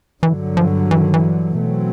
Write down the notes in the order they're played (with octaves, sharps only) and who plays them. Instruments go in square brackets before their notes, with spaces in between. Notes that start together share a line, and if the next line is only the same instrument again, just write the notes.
[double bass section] G2 D3 F#3 [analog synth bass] E3
[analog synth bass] F3
E3
D#3
E3
[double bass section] B2 F#3 A3 C4